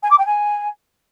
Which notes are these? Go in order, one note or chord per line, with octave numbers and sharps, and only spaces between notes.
G#5
D6
G5
G#5